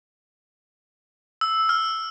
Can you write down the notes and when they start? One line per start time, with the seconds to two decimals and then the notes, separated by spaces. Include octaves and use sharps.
1.41 E6
1.69 F6